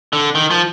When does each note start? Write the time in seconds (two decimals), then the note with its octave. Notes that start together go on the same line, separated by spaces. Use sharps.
0.13 D3
0.35 D#3
0.51 F3